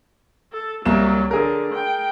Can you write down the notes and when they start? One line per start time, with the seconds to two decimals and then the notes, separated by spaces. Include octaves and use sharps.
0.53 A4
0.85 C2 F#3 A#3 E7
1.31 D3 G#4 A#4
1.74 G5